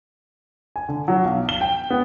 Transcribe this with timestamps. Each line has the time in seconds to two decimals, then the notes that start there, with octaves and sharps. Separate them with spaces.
0.76 G#5
0.89 D3
1.08 F#3
1.25 B1
1.49 G7
1.61 G5
1.90 B3